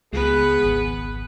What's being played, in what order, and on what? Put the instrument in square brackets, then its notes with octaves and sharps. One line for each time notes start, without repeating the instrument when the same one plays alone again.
[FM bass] C#2 [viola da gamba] B3 B4 [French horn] G#4
[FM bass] G#1